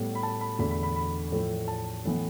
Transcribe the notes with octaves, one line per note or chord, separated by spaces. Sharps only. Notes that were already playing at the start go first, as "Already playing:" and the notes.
Already playing: A2 G3 B3
B5
A5
B5
E2 D3 A3 B5
B5
B5
B5
A2 F3 A3
A5
A2 E3 B3